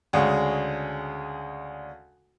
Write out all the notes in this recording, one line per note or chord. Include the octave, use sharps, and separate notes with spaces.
D2 C#3 G#3